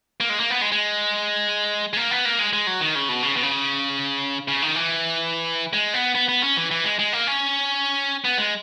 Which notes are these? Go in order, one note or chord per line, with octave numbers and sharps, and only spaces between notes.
A#3
G#3
A#3
B3
G#3
G#3
G#3
A#3
B3
A#3
G#3
G#3
F#3
D#3
C#3
B2
C#3
B2
C#3
C#3
D#3
E3
G#3
B3
B3
B3
C#4
E3
E3
G#3
G#3
A#3
C#4
B3
G#3